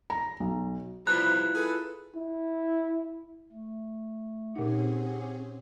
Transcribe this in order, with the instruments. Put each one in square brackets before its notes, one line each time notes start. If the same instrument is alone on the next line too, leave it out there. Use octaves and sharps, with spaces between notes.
[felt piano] A#5
B1
[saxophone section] C3 F3 G3 [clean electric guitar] E4 F4 A#5 [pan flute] B4 [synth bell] F#6
[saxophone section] G#4 A4 [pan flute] B4
[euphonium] E4
[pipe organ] A3
[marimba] A#2 D#4 [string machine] C4 C#4 G#4 [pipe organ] G4 F#5